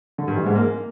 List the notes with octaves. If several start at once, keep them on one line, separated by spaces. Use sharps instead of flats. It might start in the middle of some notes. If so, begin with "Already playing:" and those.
D3
G2
E3
G#2
A#3